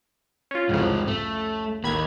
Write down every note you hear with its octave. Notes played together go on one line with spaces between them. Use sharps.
C#4 F4
C2 F2 G#2 C#3 C4
A3
A1 D#2 A#3 B5 G#6